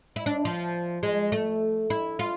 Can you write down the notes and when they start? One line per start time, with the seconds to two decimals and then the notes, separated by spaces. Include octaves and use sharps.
0.16 E4
0.26 D4
0.45 F3
1.03 G#3
1.32 A3
1.90 E4
2.19 F4